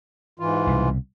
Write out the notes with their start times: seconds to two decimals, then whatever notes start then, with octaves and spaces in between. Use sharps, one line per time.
0.40 G#2 E3 F4
0.67 C2 B2